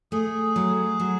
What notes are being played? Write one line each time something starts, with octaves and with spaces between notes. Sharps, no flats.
A3 G#4
F#3
F#3